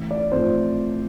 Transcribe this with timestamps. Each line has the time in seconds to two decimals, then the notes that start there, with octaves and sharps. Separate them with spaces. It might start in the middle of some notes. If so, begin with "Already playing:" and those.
Already playing: A1
0.11 D5
0.32 A2 F3 A3 C4 C5